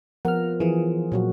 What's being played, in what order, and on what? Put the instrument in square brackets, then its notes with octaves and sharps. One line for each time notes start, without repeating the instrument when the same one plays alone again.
[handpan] F3 B3 A#4 [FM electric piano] F#5 F6
[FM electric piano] E3 [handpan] F3 G#4
[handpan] A#2 F#3 F#4